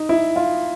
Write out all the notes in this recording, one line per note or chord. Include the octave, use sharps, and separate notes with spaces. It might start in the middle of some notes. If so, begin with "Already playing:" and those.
Already playing: D#4
E4
F4